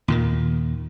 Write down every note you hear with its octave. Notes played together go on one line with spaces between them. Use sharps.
D#2 A#2 D#3